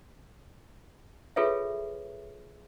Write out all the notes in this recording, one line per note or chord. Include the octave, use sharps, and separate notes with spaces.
F4 G#4 A4 B4 C#5 E5